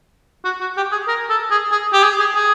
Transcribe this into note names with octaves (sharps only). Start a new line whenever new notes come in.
F#4
F#4
G4
G#4
A#4
A4
G#4
G#4
G4
G#4
G#4
G#4